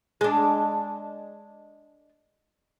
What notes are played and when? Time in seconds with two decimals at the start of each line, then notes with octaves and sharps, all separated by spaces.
0.21 G#3 D4